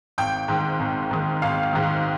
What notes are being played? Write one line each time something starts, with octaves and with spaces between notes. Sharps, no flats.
G#1 G5
G#2 D#3
G#1
G#2 D#3
G#1 F5
G#2 D#3